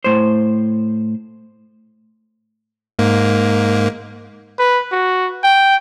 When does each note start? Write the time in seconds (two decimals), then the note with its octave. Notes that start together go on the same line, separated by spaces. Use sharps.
0.04 A2 C5
2.99 G#2 A#3
4.59 B4
4.92 F#4
5.43 G5